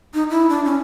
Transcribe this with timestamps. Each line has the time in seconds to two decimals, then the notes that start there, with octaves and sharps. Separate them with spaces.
0.14 D#4
0.30 E4
0.49 D4
0.65 C#4